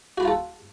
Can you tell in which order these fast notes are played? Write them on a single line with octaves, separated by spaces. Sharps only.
F#4 B5 A#5 F4 A4